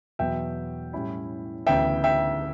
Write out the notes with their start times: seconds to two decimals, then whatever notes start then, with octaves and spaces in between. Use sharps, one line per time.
0.19 E2 B2 F#3 B3 E5 G5
0.93 A2 G3 C#4 E4
1.66 D2 C#3 E3 B3 E5 G5
2.04 E5 G5